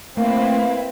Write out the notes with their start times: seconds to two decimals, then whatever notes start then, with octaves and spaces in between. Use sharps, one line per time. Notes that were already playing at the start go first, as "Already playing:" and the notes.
0.17 A3 A#3 C4 E4 B4 F5